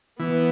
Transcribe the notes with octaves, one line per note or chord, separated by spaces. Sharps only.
E3 B3